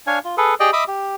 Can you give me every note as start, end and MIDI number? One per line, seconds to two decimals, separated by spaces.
0.07 0.19 62
0.07 0.19 73
0.07 0.19 77
0.07 0.19 80
0.25 0.35 65
0.37 0.54 68
0.37 0.54 69
0.37 0.54 71
0.60 0.71 67
0.60 0.71 68
0.60 0.71 74
0.60 0.71 75
0.60 0.71 79
0.73 0.84 75
0.73 0.84 76
0.73 0.84 83
0.73 0.84 86
0.73 0.84 87
0.88 1.16 67